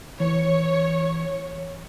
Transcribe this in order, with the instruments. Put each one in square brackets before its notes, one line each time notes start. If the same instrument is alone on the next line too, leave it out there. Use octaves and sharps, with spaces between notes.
[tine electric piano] E3 [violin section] C#5